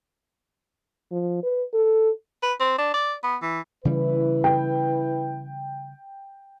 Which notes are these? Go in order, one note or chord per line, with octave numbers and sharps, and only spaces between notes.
F3
B4
A4
B4
C4
D4
D5
B3
E3
C#3 E3 G3 E4 B4
G5